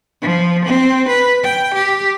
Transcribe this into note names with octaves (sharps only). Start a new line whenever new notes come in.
F3
C4
B4
G5
G4